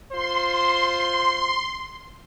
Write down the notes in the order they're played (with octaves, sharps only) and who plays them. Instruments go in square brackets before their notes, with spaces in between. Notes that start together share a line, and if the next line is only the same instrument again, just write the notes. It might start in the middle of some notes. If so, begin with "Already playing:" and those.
[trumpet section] F4 C5 [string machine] C6